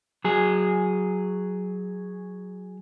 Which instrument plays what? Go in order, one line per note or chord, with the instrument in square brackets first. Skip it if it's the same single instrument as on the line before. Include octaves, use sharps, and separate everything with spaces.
[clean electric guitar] F#3 G#4